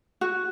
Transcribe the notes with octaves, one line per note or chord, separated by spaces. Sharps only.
F#4